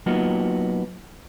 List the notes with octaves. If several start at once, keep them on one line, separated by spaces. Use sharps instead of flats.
F#3 A#3 B3 D#4 F4 F#4